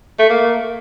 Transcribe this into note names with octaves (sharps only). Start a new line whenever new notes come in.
A3
A#3